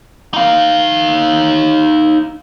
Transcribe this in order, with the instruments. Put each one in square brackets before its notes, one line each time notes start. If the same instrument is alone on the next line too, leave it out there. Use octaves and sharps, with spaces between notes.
[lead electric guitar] D#4 F5